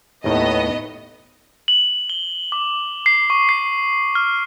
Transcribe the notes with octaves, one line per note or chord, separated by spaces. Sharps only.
D#2 A2 D#3 B3 D#5
F#7
G7
D6
C7
C#6
C7
F6